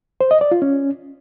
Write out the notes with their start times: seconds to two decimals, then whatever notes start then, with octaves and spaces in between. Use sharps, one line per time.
0.21 C5
0.31 D#5
0.41 D5
0.51 F4
0.62 C#4